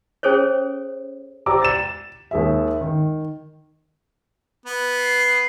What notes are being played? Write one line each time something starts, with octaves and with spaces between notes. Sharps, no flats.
C#4 G#4 A4 C5 C#5
G4 C5 D5 A#5 D6 E6
A6 E7
D#2 G#4 E5
D#3
B3
C7